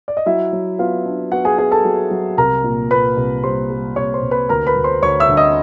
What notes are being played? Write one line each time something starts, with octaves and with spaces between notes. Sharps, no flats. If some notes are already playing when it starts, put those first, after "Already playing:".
D5
D#5
F#3 E4 E5
F#3
B3 F4 F5
D4
B3 F#4 F#5
G#4 G#5
B3 G#4 G#5
A4 A5
F#3
F#3
C2 A#4 A#5
A#2
A#2 B4 B5
C2
G3 C5 C6
G3
C2 C#5 C#6
C5 C6
C2
B4 B5
D2 A#4 A#5
B4 B5
D2
C5 C6
D2 C#5 C#6
E5 E6
D3
D#5 D#6